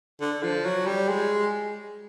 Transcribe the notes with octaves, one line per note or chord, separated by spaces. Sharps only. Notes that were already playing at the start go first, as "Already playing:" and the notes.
D3
F3
F#3
G3
G#3